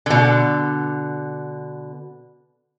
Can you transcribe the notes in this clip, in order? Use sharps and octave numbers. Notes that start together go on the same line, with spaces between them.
B2 D3